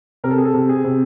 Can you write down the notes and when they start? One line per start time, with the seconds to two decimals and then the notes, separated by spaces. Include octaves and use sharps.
0.24 C3 A#4
0.31 A4
0.38 G#4
0.45 A4
0.54 C3
0.69 G#4
0.84 C3